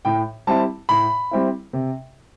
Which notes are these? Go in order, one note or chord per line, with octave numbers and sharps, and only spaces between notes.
A2 G5
G3 C4 E4 A5
A2 B5
G3 C4 E4
C3